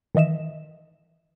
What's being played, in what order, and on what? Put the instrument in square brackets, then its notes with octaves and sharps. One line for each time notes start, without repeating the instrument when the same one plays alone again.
[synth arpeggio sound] D#3 E3 D#5 E5 E7